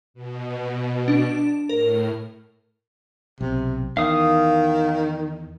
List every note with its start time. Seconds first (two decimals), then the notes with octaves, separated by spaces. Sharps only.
0.14 B2
1.08 D4
1.69 A2 A#4
3.41 B1 C3
3.97 E2 D#3 F5 D#6